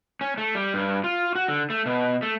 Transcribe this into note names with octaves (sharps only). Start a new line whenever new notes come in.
C#4
A3
G3
G2
F4
F#4
D3
A3
B2
A3